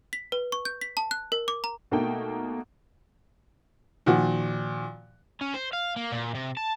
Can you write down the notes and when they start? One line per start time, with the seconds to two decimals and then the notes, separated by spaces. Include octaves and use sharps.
0.13 B6
0.32 B4
0.52 C#6
0.65 G6
0.81 B6
0.97 A5
1.11 F#6
1.32 A#4
1.48 D6
1.64 A#5
1.91 B2 A3 A#3 D#4 G5
4.06 A#2 D#3 F3 F#4
5.41 C#4
5.54 C5
5.73 F5
5.96 A#3
6.12 A#2
6.35 C3
6.57 A5